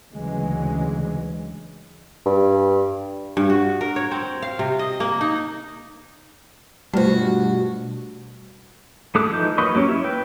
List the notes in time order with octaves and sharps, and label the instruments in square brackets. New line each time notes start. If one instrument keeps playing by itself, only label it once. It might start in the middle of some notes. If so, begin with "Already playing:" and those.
[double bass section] D2 C#3 E3 F#3 G#3
[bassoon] G2
[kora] G2
F#4
A#4
C#5
C4
F5
C3
D#5
A#3
D#4
[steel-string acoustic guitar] G2 F#4 [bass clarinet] B2 [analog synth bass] G3 [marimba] A3 F4 C5
[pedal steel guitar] A3 G#4 A4 D6 F#6
E3 F3 D#4 G6
F#3 A#3 B4 D#5 C#6
F#3 A#3 C#4 G4
E4
B4 G5